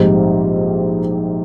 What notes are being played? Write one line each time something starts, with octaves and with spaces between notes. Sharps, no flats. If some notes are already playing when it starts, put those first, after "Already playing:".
Already playing: A#1 G#2 G3 C4 D#4